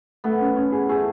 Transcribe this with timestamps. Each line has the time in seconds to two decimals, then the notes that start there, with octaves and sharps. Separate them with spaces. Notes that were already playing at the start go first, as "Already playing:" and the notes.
0.24 A3 B3
0.40 C#4
0.56 C#4
0.72 G#4
0.89 A3 G#4